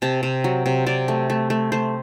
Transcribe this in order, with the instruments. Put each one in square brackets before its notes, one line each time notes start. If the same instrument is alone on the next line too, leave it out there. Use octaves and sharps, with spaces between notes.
[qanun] C3 A5
C3
F#3
C3
C3 D5
A3
A3
A3
A3 C5